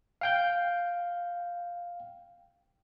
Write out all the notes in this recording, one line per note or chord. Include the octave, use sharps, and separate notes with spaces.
F5 G5 G6